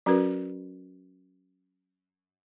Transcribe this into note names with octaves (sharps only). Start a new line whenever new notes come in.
F#3 C#4 F#4 A#4 B4